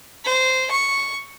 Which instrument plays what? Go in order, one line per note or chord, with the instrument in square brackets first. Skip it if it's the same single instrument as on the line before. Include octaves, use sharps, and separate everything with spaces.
[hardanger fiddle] C5
C#6